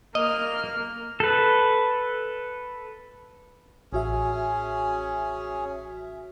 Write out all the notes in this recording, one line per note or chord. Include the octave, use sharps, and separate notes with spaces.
A#3 D#5 F6
A4 B4
A1 C#4 F#4 G#4 E5